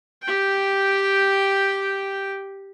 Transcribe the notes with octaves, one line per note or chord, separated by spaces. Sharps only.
G4 G5